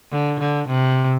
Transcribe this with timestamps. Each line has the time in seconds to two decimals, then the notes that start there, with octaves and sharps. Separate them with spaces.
0.12 D3
0.40 D3
0.68 C3